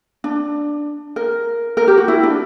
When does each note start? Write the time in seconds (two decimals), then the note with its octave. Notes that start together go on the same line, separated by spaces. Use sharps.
0.24 D4
1.16 A#4
1.77 A#4
1.88 G4
1.98 F#4
2.08 E4
2.23 D4